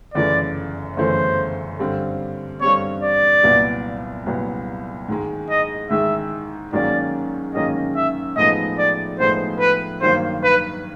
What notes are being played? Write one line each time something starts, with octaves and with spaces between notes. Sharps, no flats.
G1 F#2 C#3 E3 A3 D5
G1 F#2 C#3 E3 A3 C5
G2 D3 G3 C4
G2 D3 G3 C4 C#5
D5
C2 A#2 F#3 B3
C2 A#2 F#3 B3
G#2 D#3 G#3
D#5
G#2 D#3 G#3 E5
G#2 D#3 F#3 A#3 C#4 D5
G#2 D#3 F#3 A#3 C#4 D#5
E5
A2 F3 G#3 B3 D#4 D#5
D5
A2 F3 G#3 B3 D#4 C5
B4
G2 D#3 F#3 A#3 C5
B4